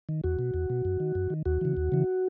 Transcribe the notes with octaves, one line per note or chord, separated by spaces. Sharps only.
D#3
E2 F#4
B2
E2
B2
F#2
D#3
F#2
D#3
D#2 F#4
C#3 E3
D#2
C#3 E3